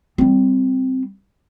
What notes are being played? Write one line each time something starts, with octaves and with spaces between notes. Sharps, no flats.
G3 C4